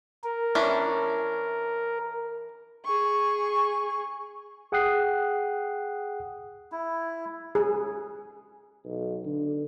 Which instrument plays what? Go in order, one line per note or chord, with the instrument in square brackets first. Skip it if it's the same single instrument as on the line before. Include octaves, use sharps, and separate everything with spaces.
[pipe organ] A#4
[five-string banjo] E3 C#4 D4
[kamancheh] G#4 C#6
[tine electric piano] G#4 F#5 G5 D#6 F#6 C7
[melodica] E4
[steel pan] G#4
[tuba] B1
D3